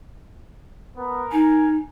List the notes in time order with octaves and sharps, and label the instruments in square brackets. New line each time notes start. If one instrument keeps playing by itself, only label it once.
[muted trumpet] B3 [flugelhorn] A#4
[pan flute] D#4 [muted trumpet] G#5